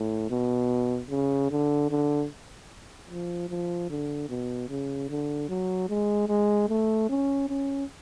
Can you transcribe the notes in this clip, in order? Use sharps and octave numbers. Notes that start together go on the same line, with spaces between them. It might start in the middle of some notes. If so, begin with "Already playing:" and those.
Already playing: A2
B2
C#3
D3
D3
F3
F3
D3
B2
C#3
D3
F#3
G#3
G#3
A3
C#4
C#4